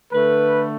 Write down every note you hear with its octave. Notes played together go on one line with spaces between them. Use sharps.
D3 A3 B4